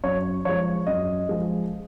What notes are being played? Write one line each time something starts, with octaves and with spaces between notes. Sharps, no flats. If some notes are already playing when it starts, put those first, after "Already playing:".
F#2 C#5
F3 G#3 C#5
F#2 D#5
F3 G#3